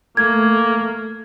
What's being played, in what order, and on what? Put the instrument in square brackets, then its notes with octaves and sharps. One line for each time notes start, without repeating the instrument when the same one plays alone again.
[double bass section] A3 [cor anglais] A#3 [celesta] G#6